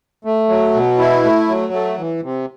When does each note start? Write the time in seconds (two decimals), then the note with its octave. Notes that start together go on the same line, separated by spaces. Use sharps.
0.25 A3
0.49 F#3
0.74 B2
0.99 E4
1.24 A3
1.48 F#3
1.73 A3
1.98 E3
2.23 C3